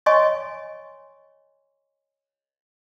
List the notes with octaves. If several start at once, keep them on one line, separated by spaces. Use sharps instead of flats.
C#5 D#5 G#5 C6 C#6